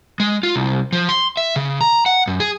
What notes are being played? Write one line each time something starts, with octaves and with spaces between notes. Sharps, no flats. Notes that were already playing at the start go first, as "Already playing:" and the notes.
G#3
F4
C2
F3
C6
E5
C#3
A#5
F#5
F#2
G#4